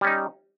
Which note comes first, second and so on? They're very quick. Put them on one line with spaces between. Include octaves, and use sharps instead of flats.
G3 C#4 D#4